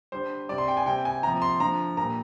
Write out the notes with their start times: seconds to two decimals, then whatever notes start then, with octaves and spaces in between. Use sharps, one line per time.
0.12 D3 G3 C5
0.49 C3 G3 D5
0.58 C6
0.68 G5
0.77 G#5
0.86 C3 G3 G5
1.05 G#5
1.23 C3 F3 A#5
1.42 C6
1.60 D3 F3 A#5
1.97 A#2 G3 A#5